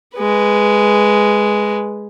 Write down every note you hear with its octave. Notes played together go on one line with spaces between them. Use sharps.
G#3 B4